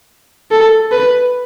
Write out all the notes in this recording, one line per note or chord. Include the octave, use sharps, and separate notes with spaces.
A4
B4